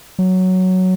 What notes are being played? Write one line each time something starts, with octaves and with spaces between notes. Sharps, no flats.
F#3